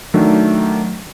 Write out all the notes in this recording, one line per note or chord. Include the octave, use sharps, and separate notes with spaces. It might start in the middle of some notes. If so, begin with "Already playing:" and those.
D#3 F#3 A3 D4